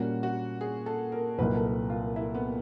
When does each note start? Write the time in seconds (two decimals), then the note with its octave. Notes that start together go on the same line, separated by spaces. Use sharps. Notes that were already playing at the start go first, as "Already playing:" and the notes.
Already playing: A#2 G3 A#3 C#4 F#4
0.23 F#4
0.61 G#4
0.86 A4
1.12 A#4
1.38 C2 A#2 F#3 A#3 D#4 B4
1.56 A4
1.64 A#4
1.90 F4
2.16 E4
2.35 B3